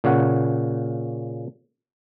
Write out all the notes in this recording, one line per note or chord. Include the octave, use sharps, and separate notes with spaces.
A#2 C#3 C#5 F#5